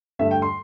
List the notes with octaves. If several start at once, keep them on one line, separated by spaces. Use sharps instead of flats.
G2 D3 A3 E5
G5
C6